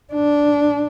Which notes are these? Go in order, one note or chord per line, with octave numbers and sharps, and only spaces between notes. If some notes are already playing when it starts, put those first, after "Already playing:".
D4